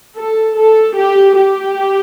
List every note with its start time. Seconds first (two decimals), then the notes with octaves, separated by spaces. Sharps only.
0.17 A4
0.57 A4
0.96 G4
1.36 G4